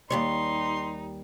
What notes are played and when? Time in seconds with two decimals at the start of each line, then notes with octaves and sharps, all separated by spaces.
0.10 D#2 G3 D#4 C#5 C6